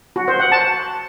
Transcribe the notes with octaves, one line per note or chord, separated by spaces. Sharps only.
F#4
C5
F#5
A5